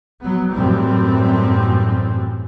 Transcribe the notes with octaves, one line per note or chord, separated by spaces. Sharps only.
F#3 B3
F#2 A2 E3 G3 C4